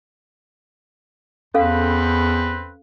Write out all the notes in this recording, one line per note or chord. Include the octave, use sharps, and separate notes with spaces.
E2 C4 C#4 A4 B4 F5